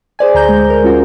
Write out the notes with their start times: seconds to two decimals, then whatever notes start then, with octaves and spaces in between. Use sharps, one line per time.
0.19 G#4 C5 D5 G#5
0.35 D2 A#5 G6
0.49 G#3
0.70 A#4
0.83 G#3 C#4 F4 F#4